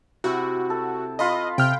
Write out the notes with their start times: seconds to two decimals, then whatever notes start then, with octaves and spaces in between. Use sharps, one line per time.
0.24 C3 E4 F#4
0.70 A4
1.19 F4 D#5 B5 C6
1.58 C3 G5 F6